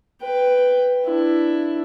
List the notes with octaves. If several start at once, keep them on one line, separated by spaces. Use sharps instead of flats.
B4 G5
D4 E4